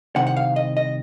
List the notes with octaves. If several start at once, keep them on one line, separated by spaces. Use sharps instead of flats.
C2 C3 D#3 F#5
F#5
F5
D#5
D#5